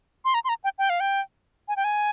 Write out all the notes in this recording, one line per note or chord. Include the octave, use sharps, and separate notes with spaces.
C6
A#5
C6
A#5
G5
G5
F5
G5
G#5
G5
G#5